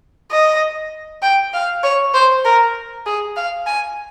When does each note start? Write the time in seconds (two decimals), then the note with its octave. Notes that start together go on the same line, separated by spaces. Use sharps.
0.31 D#5
1.22 G5
1.53 F5
1.83 C#5
2.14 C5
2.44 A#4
3.06 G#4
3.36 F5
3.67 G#5